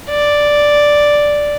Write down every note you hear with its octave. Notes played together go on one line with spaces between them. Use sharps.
D5